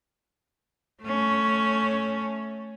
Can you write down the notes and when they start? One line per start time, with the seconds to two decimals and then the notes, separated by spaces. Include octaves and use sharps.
1.02 A3 C#4